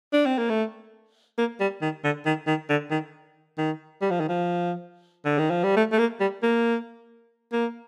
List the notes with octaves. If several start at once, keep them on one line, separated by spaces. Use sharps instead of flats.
D4
C4
A#3
A3
A#3
G3
D#3
D3
D#3
D#3
D3
D#3
D#3
G3
F3
D#3
F3
D3
D#3
F3
G3
A3
A3
A#3
G3
A#3
A#3